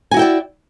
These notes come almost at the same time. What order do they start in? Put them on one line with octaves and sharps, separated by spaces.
G#5 F#4 E4 G5 D5